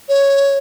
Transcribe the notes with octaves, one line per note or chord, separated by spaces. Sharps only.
C#5